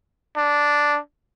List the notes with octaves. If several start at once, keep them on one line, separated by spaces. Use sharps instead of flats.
D4